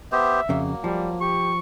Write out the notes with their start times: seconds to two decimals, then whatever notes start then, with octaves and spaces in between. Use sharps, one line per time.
0.12 B3 G4 C5 E5
0.49 F2 C#3 F#3 A#3
0.84 F3 G3
1.21 G4 C#6